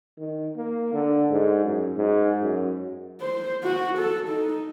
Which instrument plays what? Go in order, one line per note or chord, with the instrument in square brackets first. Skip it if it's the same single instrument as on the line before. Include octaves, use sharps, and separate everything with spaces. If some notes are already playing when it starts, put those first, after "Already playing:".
[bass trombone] D#3
A#3
D3
G#2
F#2
G#2
F#2
[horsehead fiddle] C5
F#4
A4
D#4